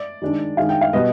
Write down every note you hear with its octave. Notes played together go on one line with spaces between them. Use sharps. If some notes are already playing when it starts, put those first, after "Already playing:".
Already playing: D5
D#3 G#3 D4
D#3 G#3 D4 F5
G5
F5
B2 G3 B3 D#5